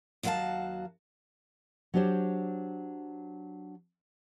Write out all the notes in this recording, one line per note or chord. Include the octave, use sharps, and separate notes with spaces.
D#2 F#3 F#4 A#4 F5 A5
F#3 D4 G4 C5 C#5